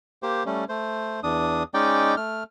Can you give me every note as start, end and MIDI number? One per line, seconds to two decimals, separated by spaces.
0.23 0.43 58
0.23 0.43 67
0.23 0.43 72
0.46 0.64 55
0.46 0.64 57
0.46 0.64 61
0.69 1.20 57
0.69 1.20 72
1.23 1.63 40
1.23 1.63 62
1.23 1.63 87
1.74 2.15 56
1.74 2.15 61
1.74 2.15 63
1.74 2.15 74
1.74 2.15 79
2.17 2.43 57
2.17 2.43 89